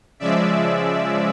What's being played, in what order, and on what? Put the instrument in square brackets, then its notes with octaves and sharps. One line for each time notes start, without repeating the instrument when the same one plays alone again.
[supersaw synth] C#3 F3 G#3 D5 E5